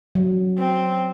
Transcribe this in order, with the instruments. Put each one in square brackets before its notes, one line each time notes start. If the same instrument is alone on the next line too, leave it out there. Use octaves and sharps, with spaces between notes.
[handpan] F#3
[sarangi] C4